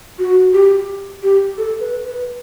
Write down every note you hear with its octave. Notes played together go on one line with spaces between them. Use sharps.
F#4
G4
G4
A4
B4
B4